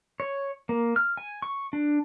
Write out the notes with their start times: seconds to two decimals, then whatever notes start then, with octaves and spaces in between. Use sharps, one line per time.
0.20 C#5
0.69 A#3
0.96 F6
1.17 G#5
1.42 C#6
1.73 D4